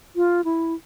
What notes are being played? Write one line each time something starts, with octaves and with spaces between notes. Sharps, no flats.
F4
E4